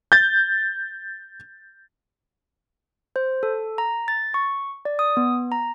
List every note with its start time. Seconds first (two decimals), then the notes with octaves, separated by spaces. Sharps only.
0.12 G6 A6
3.16 C5
3.43 A4
3.78 A#5
4.08 A6
4.34 C#6
4.85 D5
4.99 D#6
5.17 B3
5.52 A#5